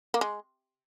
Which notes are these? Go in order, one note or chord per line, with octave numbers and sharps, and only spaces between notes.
A#3
G#3